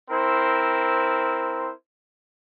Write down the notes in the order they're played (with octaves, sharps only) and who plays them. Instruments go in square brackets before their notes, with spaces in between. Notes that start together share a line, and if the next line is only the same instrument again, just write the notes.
[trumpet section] C4 E4 A#4 C5